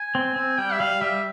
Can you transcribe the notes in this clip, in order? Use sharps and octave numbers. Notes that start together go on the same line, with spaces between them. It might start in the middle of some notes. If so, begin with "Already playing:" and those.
Already playing: G#5
C4
C4
G3 G5
E5
G3 F5
G3 E5